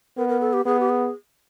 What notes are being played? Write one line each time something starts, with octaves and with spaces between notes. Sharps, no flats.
B3 A#4
A#4
A4
G4
B3 G#4
G4
G#4